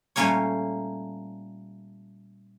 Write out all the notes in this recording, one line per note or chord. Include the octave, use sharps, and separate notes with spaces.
A#2 G3 A3 A#3 C#4 C#5